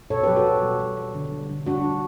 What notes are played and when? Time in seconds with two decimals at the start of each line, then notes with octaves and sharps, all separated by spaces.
0.10 B2 A4 C#5
0.23 G4 B4
0.27 F#3
0.36 F#4 A4
0.45 B2
0.63 G3
0.80 G3
0.97 G3
1.15 D3
1.32 G3
1.49 D3
1.66 G3 D4 F#4
1.84 G3